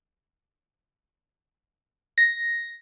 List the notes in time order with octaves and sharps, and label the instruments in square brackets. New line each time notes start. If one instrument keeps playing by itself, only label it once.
[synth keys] A#6